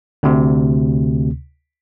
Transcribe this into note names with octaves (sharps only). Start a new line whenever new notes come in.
D2 C3